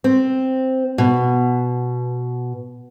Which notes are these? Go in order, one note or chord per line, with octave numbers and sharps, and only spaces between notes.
C4
B2